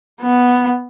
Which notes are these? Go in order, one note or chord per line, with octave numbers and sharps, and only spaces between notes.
B3